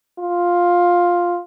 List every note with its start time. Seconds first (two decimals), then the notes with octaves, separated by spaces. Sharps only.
0.19 F4